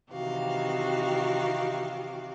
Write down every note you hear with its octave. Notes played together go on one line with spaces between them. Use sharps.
C3 D#3 E3 F#4 G4 F5